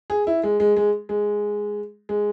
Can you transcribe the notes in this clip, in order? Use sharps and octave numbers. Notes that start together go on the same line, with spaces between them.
G#4
E4
G#3
G#3
G#3
G#3
G#3